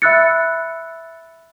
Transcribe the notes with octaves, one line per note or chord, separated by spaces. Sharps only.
E5 B5 E6 F#6 A6 C#7